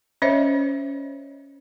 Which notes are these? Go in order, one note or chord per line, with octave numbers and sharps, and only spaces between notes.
C#4 C5 C#5 D#5 E5